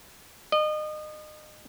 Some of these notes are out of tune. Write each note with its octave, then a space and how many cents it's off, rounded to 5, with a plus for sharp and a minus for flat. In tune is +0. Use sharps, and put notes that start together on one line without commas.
D#5 -30